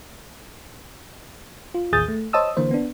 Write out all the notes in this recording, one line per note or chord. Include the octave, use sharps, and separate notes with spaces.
F4
A1 D#2 G#4 D#6 G6 A6
A3
C5 C#5 D#5 A5 D#6 E6
D3 E3 A#3 C5
B3 D4